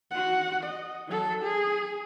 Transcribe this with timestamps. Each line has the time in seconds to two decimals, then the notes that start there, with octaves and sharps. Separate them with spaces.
0.11 F#4 F#5
0.63 D#5
1.08 F#3 A4
1.43 G#4